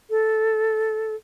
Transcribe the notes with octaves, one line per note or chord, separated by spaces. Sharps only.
A4